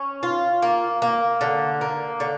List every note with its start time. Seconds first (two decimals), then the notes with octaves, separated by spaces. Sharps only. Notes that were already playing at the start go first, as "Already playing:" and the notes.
Already playing: C#4
0.23 F4
0.63 A#3
1.02 A#3
1.41 D3
1.81 A#3
2.20 D3